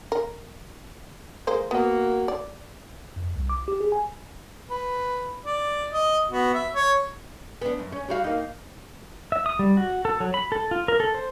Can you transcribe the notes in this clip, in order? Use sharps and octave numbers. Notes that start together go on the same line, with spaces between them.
A#4
G#3 A#3 C5
A#3 B3 F#4
D5
F2
C2
D6
G4
G#4
G#5
B4
D5
D#5
B3 F#4
E5
C#5
B3 D4
F#2
C#4
G3 F#4 F5
A#3 D#4
E5
D#6
G3
F#4
A4
F#3
B5
A4
F4
A#4
A4
C5